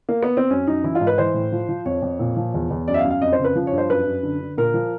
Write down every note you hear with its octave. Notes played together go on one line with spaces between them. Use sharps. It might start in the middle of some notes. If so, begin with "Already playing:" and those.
A#3
B3
C4
F#2 C#4
F#2 D#4
E3 E4
F4
G#2
B4
E3 C5
A2
F3
F3
F2 C#5
F2
A#2
F3
E2
E2
F#2 D5
E5
F5
F#2
F5
F2 D#5
C5
C#3
B4
F3
C#5
G2
C5
F#2 B4
F#2
D3
D3
A#2 A#4
F3